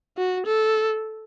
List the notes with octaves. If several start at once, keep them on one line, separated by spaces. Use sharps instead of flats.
F#4
A4